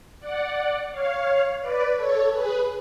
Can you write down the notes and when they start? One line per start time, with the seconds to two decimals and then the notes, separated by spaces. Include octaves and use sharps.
0.20 D5 F#5
0.91 C#5 F5
1.60 B4 D5
1.96 A4 C#5
2.30 G#4 B4